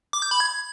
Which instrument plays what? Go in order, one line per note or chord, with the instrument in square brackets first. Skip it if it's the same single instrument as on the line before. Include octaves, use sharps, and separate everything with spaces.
[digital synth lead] D6
G6
B5
G#6